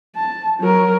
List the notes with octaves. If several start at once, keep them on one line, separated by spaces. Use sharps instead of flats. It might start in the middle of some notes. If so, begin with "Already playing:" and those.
A5
F#3 A#4